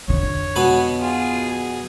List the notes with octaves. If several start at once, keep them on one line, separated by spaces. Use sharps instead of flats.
F2 D3 C#5
B2 B4
F4 G#4
G#4